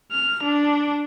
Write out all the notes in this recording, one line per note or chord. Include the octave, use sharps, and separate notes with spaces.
F6
D4